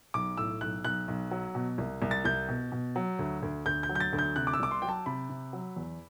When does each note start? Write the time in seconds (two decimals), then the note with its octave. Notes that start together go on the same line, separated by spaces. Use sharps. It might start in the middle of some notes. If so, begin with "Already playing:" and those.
0.14 B1 D6
0.37 A2 E6
0.61 B1 F#6
0.84 B1 F#6
1.08 B1
1.31 F#3
1.55 B2
1.78 C2
2.02 C2
2.11 A6
2.25 C2 G6
2.49 B2
2.72 B2
2.96 F#3
3.19 D2
3.42 D2
3.66 D2 G6
3.83 G6
3.89 F#3
3.95 G6
4.00 A6
4.13 D2
4.18 G6
4.36 C3 F#6
4.47 D6
4.53 E6
4.59 C2 D6
4.71 C6
4.82 F#3 G5
4.89 A5
5.06 C3 B5
5.30 C3
5.53 F#3
5.76 E2